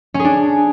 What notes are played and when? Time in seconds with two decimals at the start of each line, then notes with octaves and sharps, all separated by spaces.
0.14 C#4
0.20 G#4
0.25 D4